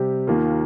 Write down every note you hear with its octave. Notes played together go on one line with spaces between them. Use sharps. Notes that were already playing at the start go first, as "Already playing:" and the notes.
Already playing: C3 G3 C4 G4
D#2 D#3 A#3 F4